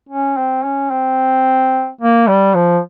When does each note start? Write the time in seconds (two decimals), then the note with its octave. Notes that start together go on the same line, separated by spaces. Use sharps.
0.09 C#4
0.37 C4
0.64 C#4
0.91 C4
2.01 A#3
2.28 G3
2.55 F3